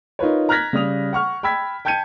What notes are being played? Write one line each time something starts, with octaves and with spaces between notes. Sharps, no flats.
D#4 F4 A#4 B4 C#5
A#5 F6 F#6 G#6 A#6 B6
C#3 G3 D#6 F7
F#5 C#6 F6
G5 B5 E6 G#6 B6
G5 A5 G6 G#6 C#7 D#7